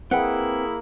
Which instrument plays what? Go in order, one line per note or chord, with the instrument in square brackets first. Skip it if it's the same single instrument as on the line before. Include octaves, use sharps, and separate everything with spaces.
[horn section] A#3 E4 [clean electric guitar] C4 B4 G5 [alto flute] G#4 [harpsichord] F#5